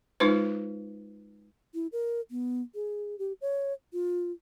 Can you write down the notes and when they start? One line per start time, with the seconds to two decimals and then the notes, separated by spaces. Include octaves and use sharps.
0.20 G#3 D#4 F4 B4 C5
1.74 E4
1.92 A#4
2.31 B3
2.75 G#4
3.19 G4
3.41 C#5
3.93 F4